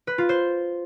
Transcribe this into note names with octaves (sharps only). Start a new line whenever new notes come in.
B4
F4
C5